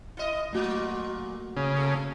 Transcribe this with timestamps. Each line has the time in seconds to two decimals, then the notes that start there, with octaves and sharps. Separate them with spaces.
0.17 E4 D#5
0.52 A#2 F#3 A3 A#3 F#4
1.57 C#3
1.77 A4